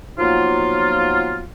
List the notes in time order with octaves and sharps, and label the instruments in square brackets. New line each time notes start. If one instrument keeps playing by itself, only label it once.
[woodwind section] F3 F#3 A#3 B3 D#4 F4